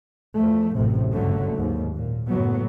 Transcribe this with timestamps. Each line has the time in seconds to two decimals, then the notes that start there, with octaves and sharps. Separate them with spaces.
0.36 E2 F3 A3
0.75 A1 F#2 A2 C3
1.11 F#1 C#2 G2 D3 F#3 A3
1.54 D#2 G#2
1.95 A#2
2.28 F#1 F#2 A2 F#3 B3